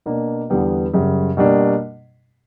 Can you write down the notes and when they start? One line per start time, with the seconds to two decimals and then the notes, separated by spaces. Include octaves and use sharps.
0.06 B2 A#3 D4
0.50 E2 D3 G3 B3
0.94 F#2 C#3 G3
1.37 B2 G3 A#3 D4